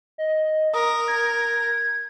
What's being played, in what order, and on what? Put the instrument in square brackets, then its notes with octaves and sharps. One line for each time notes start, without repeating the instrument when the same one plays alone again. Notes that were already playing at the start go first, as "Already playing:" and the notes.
[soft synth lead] D#5
[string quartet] A#4 [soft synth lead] D#6
[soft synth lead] G#6